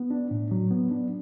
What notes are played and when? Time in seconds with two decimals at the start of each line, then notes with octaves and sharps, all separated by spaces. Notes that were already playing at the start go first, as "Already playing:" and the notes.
Already playing: B3
0.10 D4
0.31 A2
0.51 F#3
0.71 B3
0.91 D4